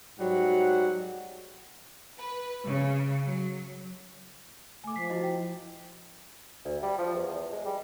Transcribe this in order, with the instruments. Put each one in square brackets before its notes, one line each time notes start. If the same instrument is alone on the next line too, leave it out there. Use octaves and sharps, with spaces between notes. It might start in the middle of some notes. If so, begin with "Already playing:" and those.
[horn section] G#2 F#3 G3 F#5
[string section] B4
C#3
F#3
[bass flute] A3 [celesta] G#5 D6
[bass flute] F3 [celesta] B6 C7
[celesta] E4 F#4 D#5
G5
[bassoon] D2
G3
F3
E2
E2
G#3
G3